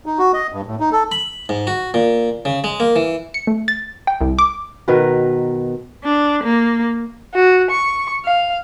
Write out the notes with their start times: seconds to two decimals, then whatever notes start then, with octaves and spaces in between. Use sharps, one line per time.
0.06 D#4
0.19 F#4
0.33 D#5
0.52 G2
0.66 A2
0.80 D#4
0.92 A4
1.12 B5
1.49 G#2
1.67 F#4
1.94 A#2
2.45 C#3
2.64 G#3
2.80 A#3
2.96 E3
3.34 C#7
3.47 A3
3.68 A6
4.07 G5
4.21 C2
4.39 D6
4.88 B2 D#3 A#4 B4
6.04 D4
6.43 A#3
7.35 F#4
7.71 C#6
8.25 F5